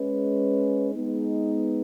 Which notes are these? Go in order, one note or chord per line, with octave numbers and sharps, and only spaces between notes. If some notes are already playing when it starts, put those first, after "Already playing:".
Already playing: G#3 C#4 B4
G#3 B3 D#4